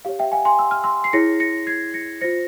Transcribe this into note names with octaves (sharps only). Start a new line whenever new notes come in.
G4 C#5 F5
E5 G5
F5 G#5
G#5 C6
E6
F6
C6 E6
C7
E4 G#4 C#5 A#6 C#7
A#6 C#7
G#6 C7
A#6 C#7
F4 C5 A#6 C#7